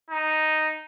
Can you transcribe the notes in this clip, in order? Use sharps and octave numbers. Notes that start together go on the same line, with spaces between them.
D#4